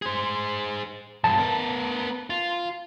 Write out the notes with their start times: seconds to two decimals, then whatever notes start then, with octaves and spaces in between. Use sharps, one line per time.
0.02 G#4 C5
1.24 B1 G2 A5
1.39 B3 A#4
2.30 F4